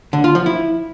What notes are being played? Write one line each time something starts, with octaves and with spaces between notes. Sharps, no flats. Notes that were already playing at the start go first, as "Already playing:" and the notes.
D3
F4
F3
E4